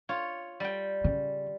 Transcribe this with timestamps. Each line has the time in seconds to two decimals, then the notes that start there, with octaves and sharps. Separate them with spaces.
0.09 F4 C#5
0.60 G3 G5
1.04 C#3